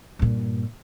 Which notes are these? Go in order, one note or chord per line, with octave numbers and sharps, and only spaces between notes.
G2 A#2